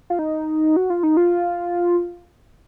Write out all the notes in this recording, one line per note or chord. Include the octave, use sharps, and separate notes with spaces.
F4
D#4
F#4
F4
D#4
F4